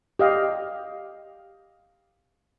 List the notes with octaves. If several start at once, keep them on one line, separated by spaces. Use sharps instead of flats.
G4 D#5 F5